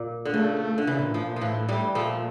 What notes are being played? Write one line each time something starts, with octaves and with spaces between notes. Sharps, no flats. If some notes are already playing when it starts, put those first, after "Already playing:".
Already playing: A#2
D3
C#3 A3
D3
C#3 E3
A#2
A2 F3
A#2
A#2 F3
A2 E3
E3 G3
A#2 F3 A3